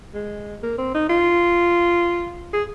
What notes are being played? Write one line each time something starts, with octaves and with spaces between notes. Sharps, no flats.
G#3
A#3
C4
D#4
F4
G#4